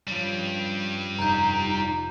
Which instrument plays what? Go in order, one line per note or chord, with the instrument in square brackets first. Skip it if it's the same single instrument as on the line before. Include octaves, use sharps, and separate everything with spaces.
[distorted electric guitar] G2 G3 [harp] F3 C#4
[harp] F1 [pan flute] D#4 [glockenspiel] A#5 G6